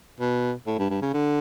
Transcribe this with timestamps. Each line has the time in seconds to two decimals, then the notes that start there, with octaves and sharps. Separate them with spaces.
0.20 B2
0.67 A2
0.79 G2
0.90 G2
1.02 C#3
1.14 D3